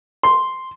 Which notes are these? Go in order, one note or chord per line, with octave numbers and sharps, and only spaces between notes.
C6